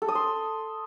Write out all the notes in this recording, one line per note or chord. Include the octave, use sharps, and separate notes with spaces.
A4
D#6
C6